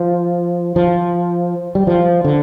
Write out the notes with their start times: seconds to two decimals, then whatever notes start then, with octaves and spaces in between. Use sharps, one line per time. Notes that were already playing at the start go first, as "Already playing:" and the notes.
Already playing: F3
0.76 F3
1.75 G3
1.87 F3
2.25 D3